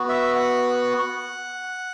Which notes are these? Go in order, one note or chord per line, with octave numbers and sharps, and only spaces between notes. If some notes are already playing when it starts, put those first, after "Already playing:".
Already playing: B3 F#4
E5
F#5